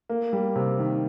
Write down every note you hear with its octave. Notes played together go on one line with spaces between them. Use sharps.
A#3
G3
C3
D#3